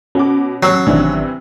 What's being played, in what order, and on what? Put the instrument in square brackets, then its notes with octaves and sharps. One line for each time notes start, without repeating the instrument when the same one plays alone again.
[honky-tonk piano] B2 F#5 D6 [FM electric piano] C#4
[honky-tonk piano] A1 E6 C7 [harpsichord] F#3
[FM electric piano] G#1 D#3 D4 [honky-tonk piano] C3 E3